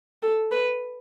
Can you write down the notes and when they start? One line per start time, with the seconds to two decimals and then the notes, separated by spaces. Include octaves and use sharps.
0.23 A4
0.52 B4